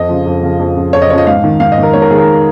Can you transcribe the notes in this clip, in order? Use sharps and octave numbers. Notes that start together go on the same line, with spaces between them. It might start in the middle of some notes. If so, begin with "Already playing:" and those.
Already playing: F2 D#5
C#3 F3
F2
C#3 F3
F2
C#3 F3
F2 C#5
D#5
C#3 F3 C#5 D#5
G#2 F5
D#3
G#2 F5
D#5
D#3
A#4
G#2 C#5
A#4
D#3 G#4
A#4